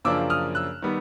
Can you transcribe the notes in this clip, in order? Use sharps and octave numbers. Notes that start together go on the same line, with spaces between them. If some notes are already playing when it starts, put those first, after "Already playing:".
F#2 C#3 F3 A#3 D4 D6 E6
D#6 F6
E6 F#6
D#3 G3 B3